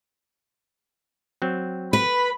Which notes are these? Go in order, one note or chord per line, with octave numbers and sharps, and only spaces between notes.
F#3 C4
B4 B5